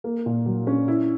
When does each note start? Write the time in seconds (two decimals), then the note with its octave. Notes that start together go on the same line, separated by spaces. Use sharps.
0.04 A#3
0.26 A#2
0.46 F#3
0.67 C#4
0.88 E4